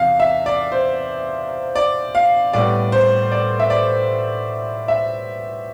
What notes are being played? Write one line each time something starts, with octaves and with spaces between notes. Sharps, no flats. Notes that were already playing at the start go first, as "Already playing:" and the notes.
Already playing: E2 C3 E3 F5
E5
D5
C5
D5
F5
A2 G3 B3 D5
C5
D5
E5
D5
E5